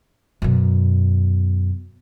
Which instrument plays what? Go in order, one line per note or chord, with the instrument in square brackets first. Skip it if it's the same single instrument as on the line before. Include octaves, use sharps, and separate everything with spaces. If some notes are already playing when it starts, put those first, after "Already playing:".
[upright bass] F#2 B2